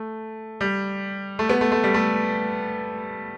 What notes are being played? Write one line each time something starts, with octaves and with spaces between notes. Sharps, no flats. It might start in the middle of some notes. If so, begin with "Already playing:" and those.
Already playing: A3
G3
A3
B3
A3
A3
G3
A3